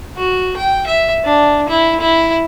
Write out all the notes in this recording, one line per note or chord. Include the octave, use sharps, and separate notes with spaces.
F#4
G5
E5
D4
E4
E4